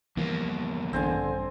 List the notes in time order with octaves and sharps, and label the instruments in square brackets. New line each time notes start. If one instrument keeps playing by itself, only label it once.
[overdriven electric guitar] E2 A#3 [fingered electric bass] E3 F3 G3
[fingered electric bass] A#1 G2 [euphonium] D3 [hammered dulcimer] C4 C5 G#5